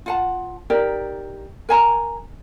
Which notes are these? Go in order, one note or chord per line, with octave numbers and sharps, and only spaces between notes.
F4 F#5 A5
D#4 G4 A#4 D5
A#4 G#5 A#5